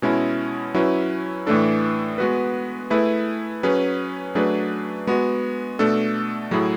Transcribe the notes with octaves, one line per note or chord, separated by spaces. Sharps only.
B2 G#3 C#4 E4
F#3 C#4 E4 B4
A2 E3 A3 D4 A4
G#3 B3 F#4 B4
A3 E4 G#4 B4
F#3 C#4 G#4 B4
F#3 A3 D4 G#4 B4
G#3 B3 F#4
B2 A3 D4 A4
A2 F#3 A3 E4 G#4